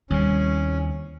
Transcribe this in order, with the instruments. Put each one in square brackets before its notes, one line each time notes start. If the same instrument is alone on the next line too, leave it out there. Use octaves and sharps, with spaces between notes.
[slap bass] D#2 C3 [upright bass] G3 E4 [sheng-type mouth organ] C#4